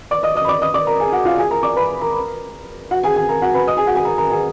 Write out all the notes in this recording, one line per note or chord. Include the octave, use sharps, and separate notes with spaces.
D5 D6
D#5 D#6
D#5 D#6
B5
D5 D6
D#5 D#6
D5 D6
A#4 A#5
G#4 G#5
F#4 F#5
F4 F5
G#4 G#5
A#4 A#5
D5 D6
B4 B5
A#4 A#5
F#4 F#5
G#4 G#5
G#4 G#5
A#4 A#5
F#4 F#5
B4 B5
D#5 D#6
G#4 G#5
F#4 F#5
G#4 G#5
A#4 A#5
A#4 A#5
G#4 G#5